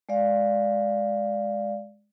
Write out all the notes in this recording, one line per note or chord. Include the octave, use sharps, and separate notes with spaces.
G#3 D5 F5